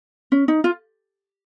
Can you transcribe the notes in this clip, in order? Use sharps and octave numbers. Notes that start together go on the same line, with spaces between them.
C#4
D#4
F4